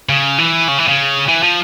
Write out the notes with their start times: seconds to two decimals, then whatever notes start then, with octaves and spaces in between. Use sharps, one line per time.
0.09 C#3
0.39 E3
0.68 C#3
0.78 E3
0.88 C#3
1.28 E3
1.43 F3